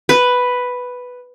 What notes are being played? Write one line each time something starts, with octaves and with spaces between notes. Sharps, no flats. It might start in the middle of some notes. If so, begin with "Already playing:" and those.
B4